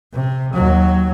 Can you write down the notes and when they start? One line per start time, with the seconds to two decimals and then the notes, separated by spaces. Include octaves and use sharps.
0.13 C3
0.53 D#2 F#3